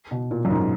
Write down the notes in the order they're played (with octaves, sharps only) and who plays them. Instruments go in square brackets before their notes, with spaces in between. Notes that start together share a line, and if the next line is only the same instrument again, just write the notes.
[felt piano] B2
A#2
F#2
G#2